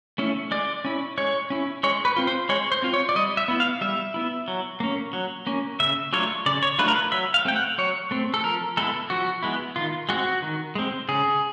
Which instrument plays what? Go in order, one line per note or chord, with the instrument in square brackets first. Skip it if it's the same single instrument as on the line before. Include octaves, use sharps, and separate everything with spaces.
[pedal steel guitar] A3 C#4 E4
G#3 D5
C#4 E4
G#3 C#5
C#4 E4
G#3 C#5
B4
C4 F4
C5
G#3 C#5
C5
C4 F4
C#5
D5
G3 D#5
E5
B3 E4
F5
G3 E5
B3 E4
F#3
A#3 C#4
F#3
A#3 C#4
C#3 E5
F#3 A3 D4 F4 C#5
C#3 D5
C#5
F#3 A3 D4 F4 B4
A#4
B4
F#3 E5
F5
A3 C4 G5
F#5
F#3 C#5
A3 C4
A4
F3 A#4
G#3 B3 E4 A4
F3 F#4
G#3 B3 E4
D#3 F4
G#3 C4 F#4
D#3
G#3 C4
C#3 G#4